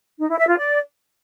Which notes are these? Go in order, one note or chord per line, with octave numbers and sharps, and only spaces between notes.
D#4
E4
E5
F4
D5